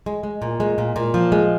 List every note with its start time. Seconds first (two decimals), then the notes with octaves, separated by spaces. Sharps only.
0.06 G#3
0.23 G#3
0.42 A#2
0.60 G#3
0.78 A#2
0.96 A#2
1.14 F3
1.32 G#3